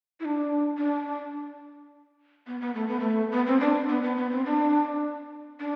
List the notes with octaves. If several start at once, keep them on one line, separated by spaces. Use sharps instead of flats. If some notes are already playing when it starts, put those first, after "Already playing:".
E4
D4
D4
B3
B3
A3
B3
A3
B3
C4
D4
B3
B3
B3
C4
D4
D4